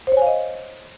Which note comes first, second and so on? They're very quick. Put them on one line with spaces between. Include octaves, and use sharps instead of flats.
C5 C#5 G#5 F5 D#5